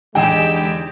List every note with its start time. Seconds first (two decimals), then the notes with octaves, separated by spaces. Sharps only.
0.15 E2 D3 G#3 D#4 G4 G#4 G5 E6